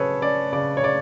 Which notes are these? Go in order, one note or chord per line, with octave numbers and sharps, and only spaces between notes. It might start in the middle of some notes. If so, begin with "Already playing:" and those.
Already playing: C#3 F#3 C#4 G#4 A4 B4 C#5
C#4 D5
C#3 D5
C#5
C#3 D5